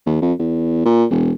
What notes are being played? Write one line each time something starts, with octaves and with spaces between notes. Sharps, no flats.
D#2
F2
E2
A#2
E1